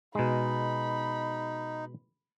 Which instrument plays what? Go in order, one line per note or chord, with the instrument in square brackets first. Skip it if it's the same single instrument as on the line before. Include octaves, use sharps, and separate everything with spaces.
[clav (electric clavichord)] B2 G#3 [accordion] D#4 [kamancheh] B5